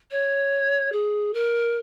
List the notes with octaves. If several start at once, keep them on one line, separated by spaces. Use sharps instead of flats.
C#5
G#4
A#4